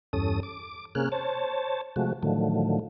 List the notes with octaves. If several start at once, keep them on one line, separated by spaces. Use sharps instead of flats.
E2 G2 C#4 A4 D#6
D6
C3 A#3 C#4 G#4 F6 F#6
C5 C#5 A5
C3 F3 G#3 A3 F#4
A2 D3 D#3 F3 F#3 A3